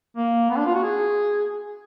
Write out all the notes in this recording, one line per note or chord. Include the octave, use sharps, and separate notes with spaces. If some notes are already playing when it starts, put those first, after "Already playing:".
A#3
B3
D4
F4
F#4
G#4